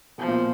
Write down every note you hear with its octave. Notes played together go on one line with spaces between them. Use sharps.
B2 F3
A#2